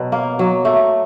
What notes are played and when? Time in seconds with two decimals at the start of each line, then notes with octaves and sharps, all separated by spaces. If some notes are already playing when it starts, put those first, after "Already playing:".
Already playing: B2 F#3
0.12 A#3
0.39 F#3
0.65 A3